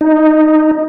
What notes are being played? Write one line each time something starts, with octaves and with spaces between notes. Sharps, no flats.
D#4